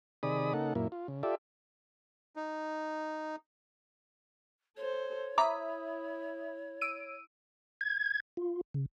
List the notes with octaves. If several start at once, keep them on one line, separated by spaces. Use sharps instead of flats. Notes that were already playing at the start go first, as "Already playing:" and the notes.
C3 D#3 G#4 D5 B5 D#6
C#3 A#3 D#4 A4 F#5
F#2 A#2 A#3 E4
F4
C#3
F4 G4 A4 D5 E5
D#4
A4 C5 C#5
E4 E5 A#5 B5 D6 D#6
E6 D7 D#7
G#6
F4
C#3